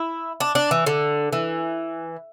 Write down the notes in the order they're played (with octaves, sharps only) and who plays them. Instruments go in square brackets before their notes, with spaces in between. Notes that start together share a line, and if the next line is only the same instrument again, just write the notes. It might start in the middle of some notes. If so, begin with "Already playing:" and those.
Already playing: [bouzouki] E4
D4
D4
E3
D3
E3